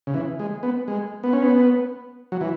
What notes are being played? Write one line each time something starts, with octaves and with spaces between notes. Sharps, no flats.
C#3
E3
G#3
B3
G#3
B3
C#4
B3
F#3
E3